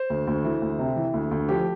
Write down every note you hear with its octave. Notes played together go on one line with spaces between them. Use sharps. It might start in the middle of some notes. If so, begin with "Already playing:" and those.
Already playing: C5
D2
D2
E3
D2
C3
E3
D2
D2
F3 G4